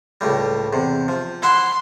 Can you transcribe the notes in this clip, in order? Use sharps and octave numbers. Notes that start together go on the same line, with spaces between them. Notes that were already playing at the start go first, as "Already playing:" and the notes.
C#2 A2 G3
E2 C3
F3
E4 E5 F#5 C6